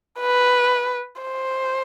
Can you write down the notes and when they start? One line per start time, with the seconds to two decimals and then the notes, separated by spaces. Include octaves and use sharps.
0.20 B4
1.22 C5